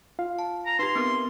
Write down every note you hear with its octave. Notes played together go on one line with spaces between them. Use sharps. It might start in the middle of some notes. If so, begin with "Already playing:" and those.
F4 F5
A5
A#5
D#4 G4 B4 C6
B3 C4 A#4